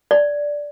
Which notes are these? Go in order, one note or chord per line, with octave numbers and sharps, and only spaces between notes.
D5